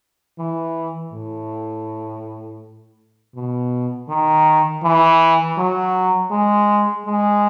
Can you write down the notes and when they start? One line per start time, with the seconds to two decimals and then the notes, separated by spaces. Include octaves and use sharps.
0.38 E3
1.12 A2
3.35 B2
4.09 D#3
4.83 E3
5.58 F#3
6.31 G#3
7.06 G#3